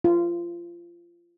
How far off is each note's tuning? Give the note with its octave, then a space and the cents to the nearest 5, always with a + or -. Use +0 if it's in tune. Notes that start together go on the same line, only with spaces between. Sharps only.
F4 -25